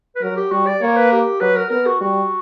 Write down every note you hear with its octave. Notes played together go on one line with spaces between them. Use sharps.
B4
F#3 A#4
G4
G3 F#4
D5
A#3 C#5
B4
G4
F#3 B4
A#4
B3 A#4
F#4
G3 F#4